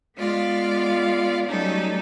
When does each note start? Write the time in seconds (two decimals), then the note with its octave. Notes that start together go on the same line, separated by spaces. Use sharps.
0.18 G#3 B3 F4 D5 F5
1.48 F#3 G3 A3 C#4 D#4 A4